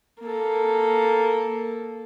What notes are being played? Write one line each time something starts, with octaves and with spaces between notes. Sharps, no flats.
A#3 A4